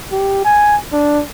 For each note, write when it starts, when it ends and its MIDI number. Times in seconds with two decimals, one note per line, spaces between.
0.12 0.41 67
0.45 0.77 80
0.92 1.22 62